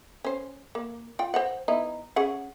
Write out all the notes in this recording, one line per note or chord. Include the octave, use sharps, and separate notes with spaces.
C#4 C5
A#3
F4 G5
C5 D#5 F#5
B3 D#4 E4
C#4 G#4 F#5